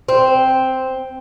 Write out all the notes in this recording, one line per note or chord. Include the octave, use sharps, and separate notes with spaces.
C4